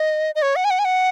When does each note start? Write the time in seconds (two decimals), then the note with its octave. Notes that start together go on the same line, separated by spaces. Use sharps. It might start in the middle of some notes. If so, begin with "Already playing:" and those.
Already playing: D#5
0.35 D#5
0.42 C#5
0.56 F#5
0.65 G#5
0.70 F#5
0.79 G#5
0.85 F#5